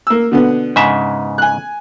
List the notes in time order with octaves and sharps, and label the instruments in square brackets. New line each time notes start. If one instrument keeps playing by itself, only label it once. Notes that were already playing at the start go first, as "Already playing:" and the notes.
[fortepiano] A#3 E6
B2 D3 B3
[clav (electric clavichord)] G#2 C#3 E5
[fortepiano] G#5 F#6